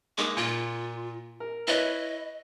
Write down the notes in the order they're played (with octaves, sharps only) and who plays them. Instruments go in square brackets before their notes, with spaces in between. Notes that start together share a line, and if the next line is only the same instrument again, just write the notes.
[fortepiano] G#3 A#3 D#4 [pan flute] D6
[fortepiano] A#2 [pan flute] F4
[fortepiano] A#4
[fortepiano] E4 B4 C#5 [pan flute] D#5